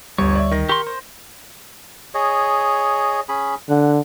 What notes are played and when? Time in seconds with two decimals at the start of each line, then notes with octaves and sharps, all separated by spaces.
0.18 G1 D2 G3 C#5
0.35 D5 E5
0.51 D#3 A#6
0.69 G4 A#4 C6 C#6
0.87 C5
2.15 G#4 C#5 D#5
3.29 C#4 G#4 B5
3.69 D3 F#5